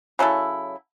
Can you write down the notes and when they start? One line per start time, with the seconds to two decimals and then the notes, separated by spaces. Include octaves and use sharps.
0.19 C#3 F#3 E4 A4